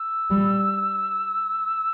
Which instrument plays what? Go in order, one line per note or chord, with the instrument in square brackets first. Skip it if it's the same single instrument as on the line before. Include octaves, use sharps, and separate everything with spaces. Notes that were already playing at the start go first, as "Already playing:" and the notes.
Already playing: [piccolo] E6
[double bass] G3